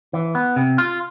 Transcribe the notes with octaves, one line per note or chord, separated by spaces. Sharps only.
E3
B3
C3
F4